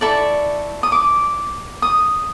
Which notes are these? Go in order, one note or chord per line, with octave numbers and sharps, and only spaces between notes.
E4 A4 D5 C#6
D#6
D6
D#6